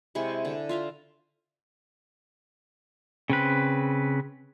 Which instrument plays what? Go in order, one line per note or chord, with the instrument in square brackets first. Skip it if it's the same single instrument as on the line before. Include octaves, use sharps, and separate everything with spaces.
[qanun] C3 G#3 E4 C#6
D3
F4 E5 F5 A#5
[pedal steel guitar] C#3 C4 B4